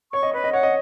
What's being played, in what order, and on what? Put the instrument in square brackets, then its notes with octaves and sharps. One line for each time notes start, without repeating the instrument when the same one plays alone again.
[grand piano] C#5 [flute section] C#6
[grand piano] D#5
[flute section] B4 [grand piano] C#5
[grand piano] D#5
[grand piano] C#5 [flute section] F#5
[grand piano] D#5